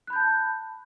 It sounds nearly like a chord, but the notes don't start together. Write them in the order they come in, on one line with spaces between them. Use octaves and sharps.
F#6 B5 G6 A5